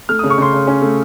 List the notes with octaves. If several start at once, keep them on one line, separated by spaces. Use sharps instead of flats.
A3 F6
C#3 D#6
C#6
C#3 C6
C#3
C#4
A3